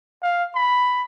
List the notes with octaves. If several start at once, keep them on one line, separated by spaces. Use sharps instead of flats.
F5
B5